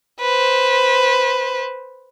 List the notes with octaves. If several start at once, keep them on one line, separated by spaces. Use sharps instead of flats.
B4 C5